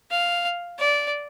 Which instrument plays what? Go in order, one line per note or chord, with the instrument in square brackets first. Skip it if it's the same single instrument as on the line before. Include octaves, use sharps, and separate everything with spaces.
[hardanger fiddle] F5
D5